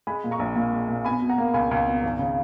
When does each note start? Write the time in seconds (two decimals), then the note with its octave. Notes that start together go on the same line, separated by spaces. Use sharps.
0.07 G#3 G#5 B5
0.24 A#2
0.31 A#5 C#6
0.39 A#1
0.56 A#2
0.73 G#3
0.89 A#2
1.05 B2 G#5 B5
1.21 B2
1.29 F#5 A#5
1.38 A#3
1.54 C#2 G#5 B5
1.71 C#2
1.87 B2
2.03 G#1
2.19 C#3